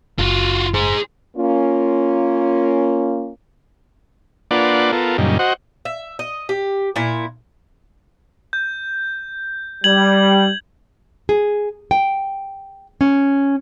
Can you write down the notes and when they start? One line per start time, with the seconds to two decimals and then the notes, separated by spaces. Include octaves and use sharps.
0.19 F#1 F4 F#4
0.74 G#4 C5
1.36 A#3 C#4 F4
4.51 A#3 D4 F4 B4 D5 F#5
4.93 B3 F4 A4 A#4
5.18 F#2 A#2 C#3 G3 D#4
5.39 F#4 C5 D#5 F#5
5.85 E5
6.19 D#5
6.49 G4
6.96 A#2 E4
8.53 G6
9.84 G3 G#6 F#7
11.29 G#4
11.91 G5
13.01 C#4